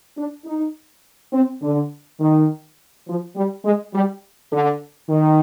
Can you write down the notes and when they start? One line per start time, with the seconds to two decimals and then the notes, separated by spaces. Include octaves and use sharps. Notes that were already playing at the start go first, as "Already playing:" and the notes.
0.17 D4
0.45 D#4
1.33 C4
1.62 D3
2.19 D#3
3.07 F3
3.36 G3
3.64 G#3
3.93 G3
4.51 D3
5.09 D#3